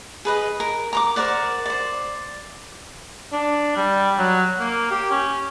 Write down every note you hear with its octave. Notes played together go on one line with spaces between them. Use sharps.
G#4 B4 D#5
A#4
A#5 C6 D6
A#4 C5 D5 F#5
C5 D5
D4
G3
F#3
A#3
G4
C#4